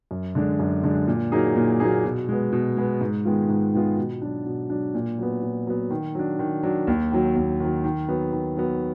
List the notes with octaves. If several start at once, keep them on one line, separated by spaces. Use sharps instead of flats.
F#2
D3 G#3 D4
F#2
D3 G#3 D4
A#2
F#3 A#3 D#4 G#4
A#2
F#3 A#3 D#4 G#4
B2
G#3 B3
B2
G#3 B3
G#2
D#3 G#3 B3 F4
G#2
D#3 G#3 B3 F4
B2
F#3 D4
B2
F#3 D4
A#2
F#3 B3
A#2
F#3 B3
D#3
F#3 D4
D#3
F#3 D4
D#2
D#3 F#3
D#2
D#3 F#3
D#3
F#3 B3
D#3
F#3 B3